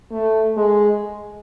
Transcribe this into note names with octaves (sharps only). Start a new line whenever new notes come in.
A3
G#3